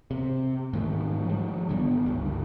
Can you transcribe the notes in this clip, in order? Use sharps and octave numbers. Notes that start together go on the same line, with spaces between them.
C3
G#2 D#3 A3
F3 G3
G#1 D3 G3 B3
C#2 G2